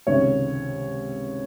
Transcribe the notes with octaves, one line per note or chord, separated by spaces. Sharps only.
C#2 C3 D#3 C#5